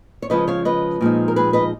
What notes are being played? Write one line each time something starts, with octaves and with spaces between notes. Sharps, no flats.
C#5
C#3 F3 G#3 B4 D#5
C#5 F5
B4 D#5
A#2 F3 G#3 D#4
A#4
G#4 B4
B4 D#5